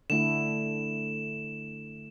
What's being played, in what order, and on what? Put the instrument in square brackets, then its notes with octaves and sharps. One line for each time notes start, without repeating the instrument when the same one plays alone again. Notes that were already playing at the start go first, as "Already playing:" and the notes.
[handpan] D3 A3 E4 [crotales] E7